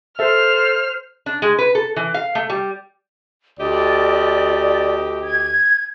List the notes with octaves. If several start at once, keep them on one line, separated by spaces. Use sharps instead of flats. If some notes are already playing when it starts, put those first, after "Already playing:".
A4 C5 E5 F6
D4
G#3
B4
A4
E3
F5
A3
G3
D2 G4 D5 D#5
G#6